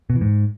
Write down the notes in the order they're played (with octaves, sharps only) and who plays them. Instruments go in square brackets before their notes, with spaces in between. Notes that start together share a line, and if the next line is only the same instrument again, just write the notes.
[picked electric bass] B2
E3
G#2